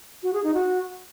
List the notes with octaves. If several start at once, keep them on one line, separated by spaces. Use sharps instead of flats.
F#4
G#4
D#4
F#4